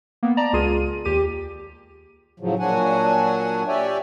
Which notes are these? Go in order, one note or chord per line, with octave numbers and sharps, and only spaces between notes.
A#3 B3
D5 A5 A#5
C#2 F4 G#4 D#7
D#2 G4 D#7
A2 C#3 F3 F#3
A#2 F#3 D4 F#4 F#5 G#5
G4 C#5 D5 E5 G5 G#5